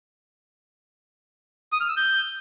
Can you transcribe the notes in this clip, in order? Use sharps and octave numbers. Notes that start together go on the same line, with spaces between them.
D#6
F6
E6
G6